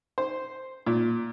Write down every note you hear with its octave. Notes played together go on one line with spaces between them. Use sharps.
C5
A#2